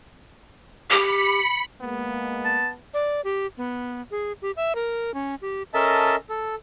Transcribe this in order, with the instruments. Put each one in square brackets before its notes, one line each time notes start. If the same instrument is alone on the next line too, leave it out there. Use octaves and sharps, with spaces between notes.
[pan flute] G4 [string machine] B5 C#7
[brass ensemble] G#3 A#3 [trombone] B3
[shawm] A5
[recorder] D5
G4
B3
G#4
G4
E5
A#4
C#4
G4
[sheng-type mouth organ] C#4 A4 A#4 D#5 E5 A5
A4